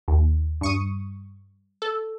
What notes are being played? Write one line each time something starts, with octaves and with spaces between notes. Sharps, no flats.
D#2
G2 C#6 D#6
A4